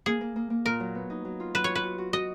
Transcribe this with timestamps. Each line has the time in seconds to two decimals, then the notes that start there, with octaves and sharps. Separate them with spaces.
0.06 A#3 G#4
0.21 A#3
0.36 A#3
0.50 A#3
0.65 A#2 A#4
0.80 F#3
0.95 B3
1.10 D#4
1.25 F#3
1.40 F4
1.54 F#3 B4
1.64 F4 C#5
1.75 B4
1.84 F#4
1.98 F#4
2.13 F#4 D#5